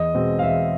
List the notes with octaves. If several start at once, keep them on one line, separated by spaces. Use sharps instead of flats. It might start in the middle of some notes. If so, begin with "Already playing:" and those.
Already playing: E2 D#5
B2 G#3 C4
F5
E2 E5